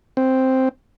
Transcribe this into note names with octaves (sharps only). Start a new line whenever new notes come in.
C4